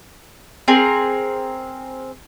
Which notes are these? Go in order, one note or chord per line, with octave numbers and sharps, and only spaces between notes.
C4 G#4 A#4